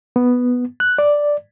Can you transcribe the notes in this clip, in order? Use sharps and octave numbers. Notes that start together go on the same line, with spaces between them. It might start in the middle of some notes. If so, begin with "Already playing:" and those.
B3
F#6
D5